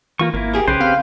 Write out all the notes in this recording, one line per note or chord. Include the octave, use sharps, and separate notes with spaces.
E3 A#3 F4 C#6
G#1 A#3 E4
G4 G#4 A#4
B1 C#3 G4 B4 C5
C4 F5